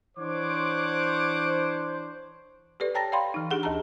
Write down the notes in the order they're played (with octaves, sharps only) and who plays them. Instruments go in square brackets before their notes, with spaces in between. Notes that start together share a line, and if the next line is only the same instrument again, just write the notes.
[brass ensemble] E3 D4 C5 [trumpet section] C#5 F#5 D6
[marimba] G4 A4 B4 D5
C#5 G5 A5 A#5 A6 A#6
D5 F5 G5 B5 C6
E3 D#4
D4 G4 G#4 F#5
D2 G#4 A5 A#5